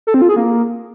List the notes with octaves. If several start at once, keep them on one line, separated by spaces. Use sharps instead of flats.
A4
C4
F4
G#4
A#3